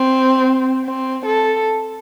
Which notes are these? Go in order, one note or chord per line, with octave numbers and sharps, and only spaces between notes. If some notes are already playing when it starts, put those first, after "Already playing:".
Already playing: C4
C4
A4